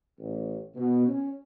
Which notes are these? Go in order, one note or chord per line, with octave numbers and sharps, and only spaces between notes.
A1
B2
C#4